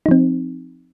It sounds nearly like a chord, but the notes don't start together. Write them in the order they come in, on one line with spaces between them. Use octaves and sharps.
D#4 F3 C4